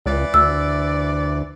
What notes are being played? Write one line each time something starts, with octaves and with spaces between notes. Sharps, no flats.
C#2 E3 D5
D2 E6